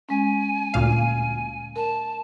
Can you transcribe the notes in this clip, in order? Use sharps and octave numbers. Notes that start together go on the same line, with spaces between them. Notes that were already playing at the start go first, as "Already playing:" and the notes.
G#3 C#4 G#5
D2 A#2 F5
A#4 A5